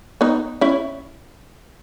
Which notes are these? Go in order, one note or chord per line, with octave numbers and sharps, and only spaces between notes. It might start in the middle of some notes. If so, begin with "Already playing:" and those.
B3 D#4
C#4 E4